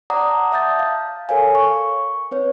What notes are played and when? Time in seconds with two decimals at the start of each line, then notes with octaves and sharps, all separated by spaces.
0.10 D5 F#5 A5 A#5 D6 D#6
0.52 E5 A5 D#6 G6 A6
0.79 F5
1.29 A4 A#4 C#5 F5 G#5
1.55 C#6
2.31 C4 B4 C#5